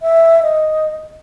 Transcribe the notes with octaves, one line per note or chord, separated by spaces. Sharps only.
E5
D#5